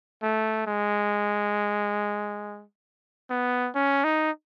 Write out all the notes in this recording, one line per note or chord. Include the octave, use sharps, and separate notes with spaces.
A3
G#3
B3
C#4
D#4